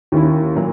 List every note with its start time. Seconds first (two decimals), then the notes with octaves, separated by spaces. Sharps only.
0.12 D#2 D#3 A#3 C#4 E4
0.55 A#2 F#3 A#3